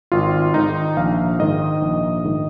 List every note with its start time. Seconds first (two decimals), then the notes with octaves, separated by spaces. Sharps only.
0.12 G#1 F4
0.54 G#2 D#3 D#4
0.97 A#1 F5
1.39 G#2 D#3 D#5
1.82 A#1
2.24 G#2 D#3